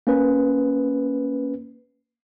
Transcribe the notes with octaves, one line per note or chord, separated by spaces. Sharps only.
A#3 C#4 B4